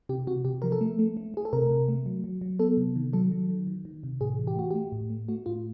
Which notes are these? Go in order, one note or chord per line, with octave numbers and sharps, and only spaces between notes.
C3 G4
C3 F#4
C3 G4
F3 A#4
A4
A3
A3
A3
A3 G#4
A4
C3 A#4
C3
A3
F#3
F#3
F#3
B3 A4
C3
D#3
F#3 A4
F#3
D#3
D#3
D#3
C3
A2 G#4
E3
G4
A3 F#4
A3 G4
A2
A3
A3 F#4
A2 F4